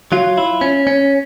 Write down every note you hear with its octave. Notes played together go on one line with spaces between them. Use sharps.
F#3 F4
E4
C#4
C#4